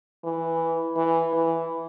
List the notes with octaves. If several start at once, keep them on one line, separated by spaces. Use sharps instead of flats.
E3
E3
E3